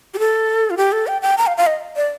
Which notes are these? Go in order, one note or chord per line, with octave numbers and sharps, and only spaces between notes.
G4
A4
F4
G4
A4
G5
G5
A#5
F5
F5
D#5
D5